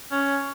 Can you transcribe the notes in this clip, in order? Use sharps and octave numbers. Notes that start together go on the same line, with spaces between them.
C#4